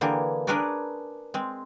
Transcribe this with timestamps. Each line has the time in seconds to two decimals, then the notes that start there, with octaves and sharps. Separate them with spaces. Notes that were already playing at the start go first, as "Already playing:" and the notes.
0.01 D3 E3 A#3 G4 G#4
0.47 D4 G#4 A#4 B4 C#5 D5
1.34 G#3 C4